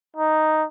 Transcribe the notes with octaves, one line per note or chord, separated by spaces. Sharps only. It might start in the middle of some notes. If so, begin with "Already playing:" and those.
D#4